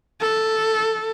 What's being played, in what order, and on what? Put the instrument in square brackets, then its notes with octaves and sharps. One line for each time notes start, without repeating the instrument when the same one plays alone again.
[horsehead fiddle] A4